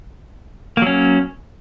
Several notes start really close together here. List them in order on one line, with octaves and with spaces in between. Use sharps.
A#3 F#3 C#4